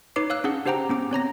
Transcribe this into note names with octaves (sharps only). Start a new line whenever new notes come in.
D#4 B4 C#5 D6 C7
C#5 F5 E6 F#6
C#4 D4 G#4 F#5
D4 G4 C5 F#5 G5 A#5
B3 C#4 D6
C4 C#5 A#5 A#6